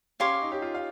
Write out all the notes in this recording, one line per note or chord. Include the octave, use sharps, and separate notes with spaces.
C#4 G4 C#5 F5 C6
D#4
G4
F4
F5